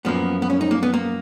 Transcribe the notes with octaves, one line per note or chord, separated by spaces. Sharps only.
F#2 F3 A#3 B3
B3
C#4
D#4
A#3
B3
A#3